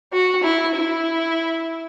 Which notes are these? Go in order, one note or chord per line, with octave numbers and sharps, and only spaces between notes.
F#4
E4
E4